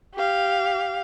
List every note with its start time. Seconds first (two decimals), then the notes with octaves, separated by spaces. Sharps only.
0.15 G4 F5